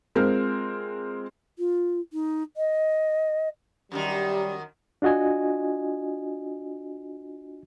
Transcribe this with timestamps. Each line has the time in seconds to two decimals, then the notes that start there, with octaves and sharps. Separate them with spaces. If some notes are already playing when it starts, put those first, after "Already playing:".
0.15 G#3 C4 F4 A#4
1.58 F4
2.13 D#4
2.57 D#5
3.92 F#2 D3 D#3 G3 G4
5.02 D4 F4 F#4 D#5 G#5